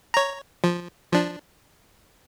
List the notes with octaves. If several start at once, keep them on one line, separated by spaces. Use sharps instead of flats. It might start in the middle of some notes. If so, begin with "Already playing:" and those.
C#5 A#5
F3
F3 D4